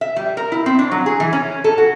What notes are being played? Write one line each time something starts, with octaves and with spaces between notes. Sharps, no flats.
E5
G3
A#4
E4
C4
D4
F#3
G#4
E3
C#4
A4
F#4